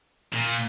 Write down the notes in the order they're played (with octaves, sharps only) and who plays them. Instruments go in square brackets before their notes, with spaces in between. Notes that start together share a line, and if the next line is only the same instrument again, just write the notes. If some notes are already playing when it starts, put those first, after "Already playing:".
[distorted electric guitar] A#2